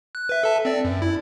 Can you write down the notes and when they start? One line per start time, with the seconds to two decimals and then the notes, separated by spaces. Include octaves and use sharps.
0.15 F#6
0.29 B4 E5
0.43 A4 E5 A5
0.65 C4 D5
0.85 F#2
1.02 E4